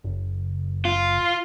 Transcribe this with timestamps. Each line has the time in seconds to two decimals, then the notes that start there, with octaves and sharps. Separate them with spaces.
0.04 F#1
0.85 F4